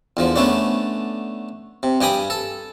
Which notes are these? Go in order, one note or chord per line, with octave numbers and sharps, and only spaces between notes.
E2 D3 F3
D3 A3 B3 C#4 D4
C3
G2 G4 G5 G#5 B5 D#6
A4